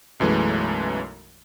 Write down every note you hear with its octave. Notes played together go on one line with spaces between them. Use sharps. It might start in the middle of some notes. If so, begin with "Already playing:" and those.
B1 F#2 E3 G#3 A3